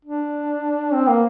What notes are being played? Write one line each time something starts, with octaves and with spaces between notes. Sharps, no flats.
D4
C4
A#3